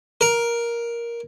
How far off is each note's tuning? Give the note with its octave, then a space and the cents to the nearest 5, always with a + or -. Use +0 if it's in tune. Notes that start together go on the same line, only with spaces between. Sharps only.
A#4 +10